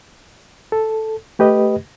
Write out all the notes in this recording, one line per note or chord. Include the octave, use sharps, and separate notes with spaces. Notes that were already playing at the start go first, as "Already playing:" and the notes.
A4
A3 G4 B4 D#5